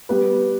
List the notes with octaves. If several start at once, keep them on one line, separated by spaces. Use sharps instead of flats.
G3 B3 G4 B4